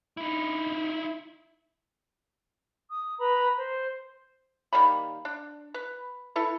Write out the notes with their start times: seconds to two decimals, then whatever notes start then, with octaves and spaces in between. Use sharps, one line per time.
0.17 D#4 E4
2.91 D#6
3.19 B4 A#5 B5
3.57 C5
4.73 D#3 G3 A#3 B5
5.25 D4
5.74 B4
6.36 E4 A4 B4